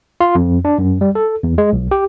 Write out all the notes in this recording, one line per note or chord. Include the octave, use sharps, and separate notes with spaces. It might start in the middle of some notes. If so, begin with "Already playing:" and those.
F4
F2
D4
F#2
G3
A4
E2
G#3
B1
G4